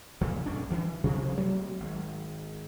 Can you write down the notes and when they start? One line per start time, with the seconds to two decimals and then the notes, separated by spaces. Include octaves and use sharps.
0.21 E2 A#2 C#3
0.46 B1 G2 C#4 D4
0.70 D#3 E3
1.04 C3 F3 C#4
1.37 F#3 A3 A#3 C4
1.80 G#1